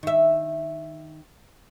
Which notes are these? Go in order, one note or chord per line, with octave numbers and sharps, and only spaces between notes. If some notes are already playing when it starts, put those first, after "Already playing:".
D#3 E5